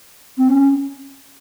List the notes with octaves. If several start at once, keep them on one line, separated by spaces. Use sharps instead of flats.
C4
C#4